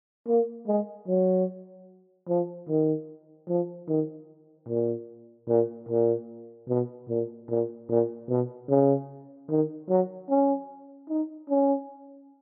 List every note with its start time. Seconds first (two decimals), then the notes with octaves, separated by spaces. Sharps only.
0.28 A#3
0.68 G#3
1.08 F#3
2.28 F3
2.69 D#3
3.49 F3
3.88 D#3
4.69 A#2
5.49 A#2
5.89 A#2
6.69 B2
7.09 A#2
7.49 A#2
7.89 A#2
8.29 B2
8.69 C#3
9.50 D#3
9.89 F#3
10.29 C#4
11.10 D#4
11.50 C#4